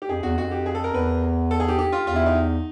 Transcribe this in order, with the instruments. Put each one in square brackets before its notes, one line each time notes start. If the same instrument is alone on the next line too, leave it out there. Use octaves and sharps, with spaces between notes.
[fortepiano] G4
[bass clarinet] F2 [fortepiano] G#4
[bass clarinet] E2 [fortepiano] F#4
[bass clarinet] F2 [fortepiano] F#4
[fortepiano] G4
G#4
A4
A#4
[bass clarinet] E2 [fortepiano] B4
[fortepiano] A4
G#4
G4
G4
F4
[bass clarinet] E2 [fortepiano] F4
[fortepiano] E4
D#4